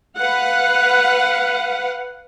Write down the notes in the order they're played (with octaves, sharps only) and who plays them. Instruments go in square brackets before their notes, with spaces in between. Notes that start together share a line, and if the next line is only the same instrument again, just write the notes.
[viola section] B4 F5 F#5